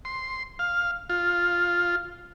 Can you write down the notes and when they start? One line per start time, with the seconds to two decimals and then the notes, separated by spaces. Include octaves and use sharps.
0.05 C6
0.59 F5
1.10 F4